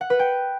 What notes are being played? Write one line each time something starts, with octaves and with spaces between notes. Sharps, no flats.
F#5
B4
G5